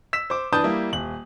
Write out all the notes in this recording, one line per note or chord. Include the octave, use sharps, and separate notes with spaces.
E6 B6 E7
C5 D6
E3 D4 B4 A5 D#6 G6
G3 A#3 E4
D#1 F#7